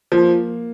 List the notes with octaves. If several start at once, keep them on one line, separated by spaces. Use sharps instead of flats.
F3 A#3